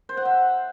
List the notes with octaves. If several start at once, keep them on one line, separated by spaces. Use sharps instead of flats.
C5
F#5
E5